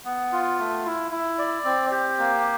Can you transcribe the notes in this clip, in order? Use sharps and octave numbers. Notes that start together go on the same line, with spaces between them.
B3
F4
A3
E4
E4
D5
C4
G4
A#3